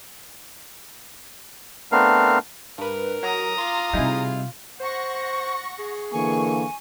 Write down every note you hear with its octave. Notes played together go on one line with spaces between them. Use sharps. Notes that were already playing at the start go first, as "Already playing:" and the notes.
A3 B3 C4 D4 A#4 F5
G2 A#4 B4
F#3 A#5 D#6
F4 C6 D6
C3 G3 D#4 E4 G#4
C5 F#5 C#6 A#6
G#4
D3 E3 A#3 G#5 C#6